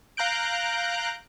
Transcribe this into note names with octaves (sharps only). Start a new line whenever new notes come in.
F5 A#5 F#6 G6 D7